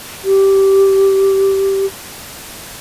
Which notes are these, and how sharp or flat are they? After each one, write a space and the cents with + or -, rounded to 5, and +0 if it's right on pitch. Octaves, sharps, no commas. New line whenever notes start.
G4 -15